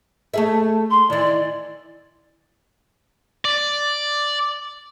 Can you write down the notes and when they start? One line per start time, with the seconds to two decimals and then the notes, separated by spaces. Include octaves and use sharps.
0.34 A3 G#4 E5
0.90 C6
1.10 D#3 E3 D5
3.45 D5